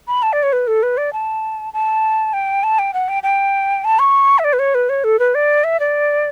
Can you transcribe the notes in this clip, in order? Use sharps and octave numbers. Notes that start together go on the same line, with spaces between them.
B5
A5
D5
C#5
B4
A4
B4
D5
A5
A5
G5
A5
G5
F#5
G5
G5
A5
C#6
E5
D5
B4
C#5
B4
C#5
A4
B4
D5
E5
D5